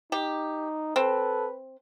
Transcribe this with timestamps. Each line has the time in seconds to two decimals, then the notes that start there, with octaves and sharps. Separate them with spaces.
0.12 D#4 G4
0.96 C4 A4 B4